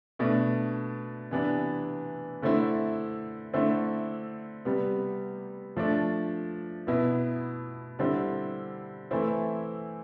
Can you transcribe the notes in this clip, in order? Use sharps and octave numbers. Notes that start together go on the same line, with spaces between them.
B2 A3 D4
C3 E3 B3 D4
D3 A3 C4 E4
D3 A3 C4 E4
C3 G3 B3
F3 A3 D4
B2 B3 E4
D3 G3 C4 E4
E3 A3 C4 E4